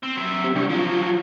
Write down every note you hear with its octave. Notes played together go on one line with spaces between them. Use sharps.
C4
F#3 E5
C4 G4
C2 D4 G5 C#6
F3 F#3 F4